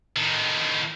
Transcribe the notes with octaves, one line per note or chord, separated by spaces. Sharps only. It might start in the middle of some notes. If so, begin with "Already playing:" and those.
A2 D#3